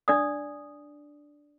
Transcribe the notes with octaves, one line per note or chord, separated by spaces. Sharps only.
D4 D5 D#6